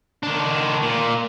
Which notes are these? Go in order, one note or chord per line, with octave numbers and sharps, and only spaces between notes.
D#3 D4
A#2